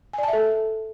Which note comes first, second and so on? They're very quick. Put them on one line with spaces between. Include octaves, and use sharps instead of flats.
G#5 D5 A5 E5 A4